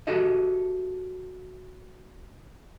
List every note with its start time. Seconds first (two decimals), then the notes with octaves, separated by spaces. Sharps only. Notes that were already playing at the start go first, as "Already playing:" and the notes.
0.07 F#4 G4 A4 D#5 E5